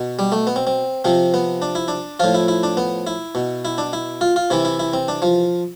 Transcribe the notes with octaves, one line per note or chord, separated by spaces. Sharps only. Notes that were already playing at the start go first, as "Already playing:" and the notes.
Already playing: B2
G3
A3
B3
C4
C4
C3 F3 C4
B3
D4
E4
D4
A2 F3 F4
E4
E4
D4
B3
E4
B2
E4
D4
E4
F4
F4
C3 E3 E4
E4
E4
C4
D4
F3